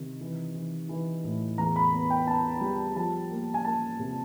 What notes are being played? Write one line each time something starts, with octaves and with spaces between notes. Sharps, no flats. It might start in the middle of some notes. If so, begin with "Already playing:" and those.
Already playing: C3 D#3
E3
E3
E3
A2
E2 A#5
B5
B3
G5
B3 A5
G3
F3 A5
A#3
G#5
A#3 A5
C3